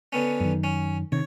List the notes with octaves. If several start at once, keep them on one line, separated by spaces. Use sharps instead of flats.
D3 B3 C#4
F#2 D#3
C#4
C3 D#3 C#5